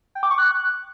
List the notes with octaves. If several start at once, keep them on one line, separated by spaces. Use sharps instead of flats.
G5
D6
C#6
F#6